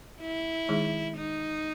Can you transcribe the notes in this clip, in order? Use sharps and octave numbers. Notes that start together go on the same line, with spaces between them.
E4
D#3 G#3 D#4 G#4
D#4